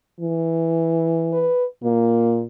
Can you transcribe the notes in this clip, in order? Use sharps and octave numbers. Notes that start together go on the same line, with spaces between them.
E3
B4
A#2 A#3